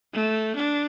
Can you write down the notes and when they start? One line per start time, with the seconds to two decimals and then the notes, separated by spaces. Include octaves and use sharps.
0.14 A3
0.56 D4